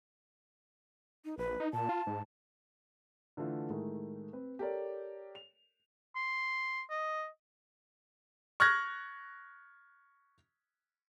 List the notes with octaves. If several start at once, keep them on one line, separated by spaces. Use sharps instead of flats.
D#4
A#1 B4
D#4
A#2 A5
F4
G#2
D3 E3 A3 F4
A2 D#3 G#3 A3
C4 B4
G4 A4 A#4 C#5 D5
F7
C6
D#5
C#6 F6 F#6 G#6 A#6